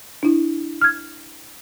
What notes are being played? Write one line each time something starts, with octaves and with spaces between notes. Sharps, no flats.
D4 E4
F6 G#6